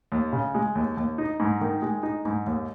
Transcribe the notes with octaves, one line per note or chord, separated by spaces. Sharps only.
D#2
C#3
G#3
D#2
D#2
D#4
G#2
D#3
G#3
D#4
G#2
D#2